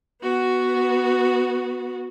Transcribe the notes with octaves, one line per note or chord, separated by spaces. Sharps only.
B3 F#4